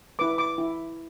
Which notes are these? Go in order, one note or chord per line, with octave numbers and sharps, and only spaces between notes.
E4 B4 D6
D6
E4